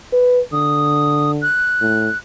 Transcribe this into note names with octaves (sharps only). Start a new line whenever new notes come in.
B4
D3 D#6
F#6
A2